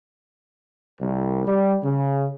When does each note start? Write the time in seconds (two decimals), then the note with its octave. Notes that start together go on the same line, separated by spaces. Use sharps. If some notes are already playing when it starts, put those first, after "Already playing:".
1.00 C2
1.45 G3
1.83 C#3